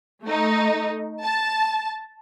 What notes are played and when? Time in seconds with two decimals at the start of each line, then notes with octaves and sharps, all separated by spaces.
0.24 A3 D#4
1.23 A5